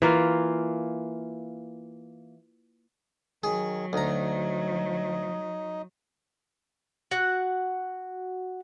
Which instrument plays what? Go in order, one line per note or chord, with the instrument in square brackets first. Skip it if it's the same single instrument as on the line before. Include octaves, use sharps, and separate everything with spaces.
[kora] E3 A#3 F4
[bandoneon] D#3 [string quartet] F#3 [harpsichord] G#4
[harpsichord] D2 A#5 [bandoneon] D#4 D#5
[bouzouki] F#4 F#5